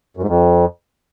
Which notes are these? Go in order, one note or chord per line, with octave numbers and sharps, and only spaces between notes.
F#2
G#2
F2